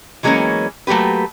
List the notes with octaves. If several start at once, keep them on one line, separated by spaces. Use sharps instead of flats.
E3 F#3 G#3 A#3 B3 C#4
F#3 A3 A#3 G4 B4